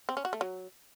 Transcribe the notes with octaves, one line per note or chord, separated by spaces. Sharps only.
C4
C#4
F#4
A3
F#3